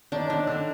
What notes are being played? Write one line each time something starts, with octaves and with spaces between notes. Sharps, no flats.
D#3 D4
D3 D4
D3 D4